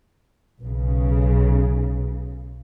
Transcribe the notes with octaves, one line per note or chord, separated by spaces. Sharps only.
B1 C#3